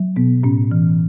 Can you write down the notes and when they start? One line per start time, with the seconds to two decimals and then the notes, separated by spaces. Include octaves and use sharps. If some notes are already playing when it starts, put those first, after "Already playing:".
Already playing: F#3
0.16 B2 B3
0.43 A2 C#4
0.71 E3